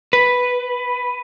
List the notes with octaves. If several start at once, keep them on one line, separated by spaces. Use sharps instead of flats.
B4